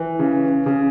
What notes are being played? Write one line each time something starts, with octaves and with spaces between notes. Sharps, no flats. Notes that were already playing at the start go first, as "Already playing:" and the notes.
Already playing: E3
C#3
C#3